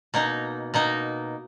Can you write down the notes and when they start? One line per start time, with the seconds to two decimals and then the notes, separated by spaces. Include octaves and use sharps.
0.14 B2 A#3 D#4
0.74 B2 A#3 D#4